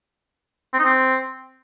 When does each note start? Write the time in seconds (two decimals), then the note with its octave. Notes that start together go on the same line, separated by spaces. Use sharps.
0.73 C4
0.79 D#4
0.85 C4